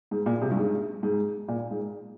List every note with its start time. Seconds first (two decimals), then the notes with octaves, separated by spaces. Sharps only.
0.11 G#2
0.26 A#2
0.42 C3
0.51 G2
0.57 G#2
1.03 G#2
1.48 A#2
1.71 G#2